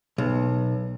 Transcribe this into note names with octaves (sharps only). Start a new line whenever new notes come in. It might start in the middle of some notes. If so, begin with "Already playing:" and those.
B1